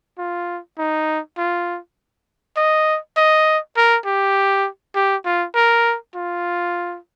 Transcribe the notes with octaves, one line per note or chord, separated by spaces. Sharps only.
F4
D#4
F4
D#5
D#5
A#4
G4
G4
F4
A#4
F4